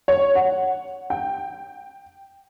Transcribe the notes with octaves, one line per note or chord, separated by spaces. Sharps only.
C#5
F#5
G5